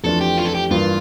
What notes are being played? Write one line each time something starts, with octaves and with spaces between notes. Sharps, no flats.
F2 E3 A3 D4 F4 A4
G4
F4
A4
G4
G2 E3 A#3 F4